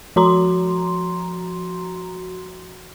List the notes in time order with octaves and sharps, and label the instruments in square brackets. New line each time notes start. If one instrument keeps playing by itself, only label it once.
[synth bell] F3 F#4 A#5 C6